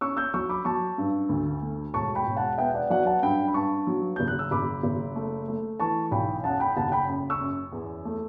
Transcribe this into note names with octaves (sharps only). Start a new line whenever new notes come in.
C#4 C#6 E6
E6 G6
F#3 C#6 E6
B5 D6
F#3 A5 C#6
G2
D2
A3
E1 A5 C#6
G5 B5
E1
F#5 A5
B3 E5 G5
D5 F#5
F#3 D5 F#5
F#5 A5
G2 G5 B5
B5
G2 A5 C#6
F#3
F#1 G6
F#6
E6
F#1 B5 D6
F#1
A3
A3
E3 A5 C#6
B1 G5 B5
F#2 F#5 A5
G5 B5
F#1 F#5 A5
G5 B5
F#2
C#6 E6
F#2
E2
A3